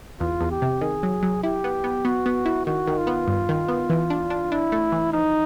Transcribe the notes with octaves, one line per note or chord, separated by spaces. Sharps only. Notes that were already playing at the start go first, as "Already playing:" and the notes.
E2 F4
E2
G4
C3
D#3 G#4
F#3
F#3
E4 G4
B3
B3
B3 F#4
B3
E4
D#3 F#4
D#3
F4
B3
G2
D#3
B3
E3
D4
D4
D4 E4
A3
E3
F3 D#4